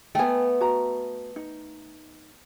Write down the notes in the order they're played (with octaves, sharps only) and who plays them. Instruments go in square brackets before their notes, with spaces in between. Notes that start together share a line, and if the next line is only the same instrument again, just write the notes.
[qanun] A3 B3 [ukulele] G5 G#5
[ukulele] F#4 A#5
D#4